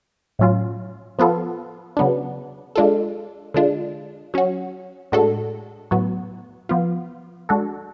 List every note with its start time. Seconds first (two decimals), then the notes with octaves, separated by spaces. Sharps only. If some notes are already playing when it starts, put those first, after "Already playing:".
0.39 A2 F#3 C#4 F4
1.19 F3 B3 F4 A4
1.97 C#3 F#3 B3 D4
2.75 G#3 D4 F4 A4
3.54 D3 G#3 D4 F4
4.34 F#3 C#4 F#4
5.12 A2 G#3 D4 F#4 A4
5.91 A2 F#3 B3 F#4
6.69 F3 B3 F4
7.49 G#3 D4 F#4 A4